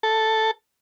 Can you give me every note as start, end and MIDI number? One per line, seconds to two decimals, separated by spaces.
0.03 0.51 69